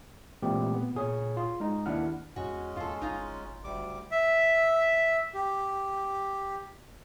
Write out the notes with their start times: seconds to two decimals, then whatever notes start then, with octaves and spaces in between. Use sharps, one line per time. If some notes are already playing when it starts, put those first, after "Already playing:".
0.43 A#2 E3 G#3 A3 C4 G4
0.74 B3
0.95 A#2 G#4 C#5
1.37 F4
1.60 G#3 D#4
1.86 D#2 D4 E4 F#5 F6
2.36 E2 G#3 C#4 F#4
2.76 D#2 F4 A4
3.01 G1 D#4 F4
3.64 F#1 D2 G3 D6
4.12 E5
5.34 G4